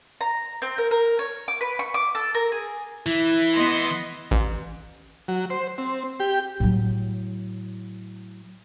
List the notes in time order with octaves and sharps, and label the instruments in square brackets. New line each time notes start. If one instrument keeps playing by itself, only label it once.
[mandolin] A#5
C4
A#4
A#4
C#5
D6
B4
C#6
D6
A4
A#4
G#4
[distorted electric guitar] E3 [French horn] E4
[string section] B3 D#5 C6
[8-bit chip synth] A1
[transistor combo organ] F#3
C5
C4
G4
[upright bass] A2 F#3